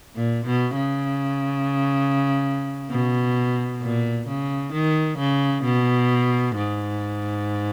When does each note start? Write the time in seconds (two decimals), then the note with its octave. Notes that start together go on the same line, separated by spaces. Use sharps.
0.15 A#2
0.46 B2
0.76 C#3
2.90 B2
3.81 A#2
4.28 C#3
4.73 D#3
5.19 C#3
5.64 B2
6.56 G#2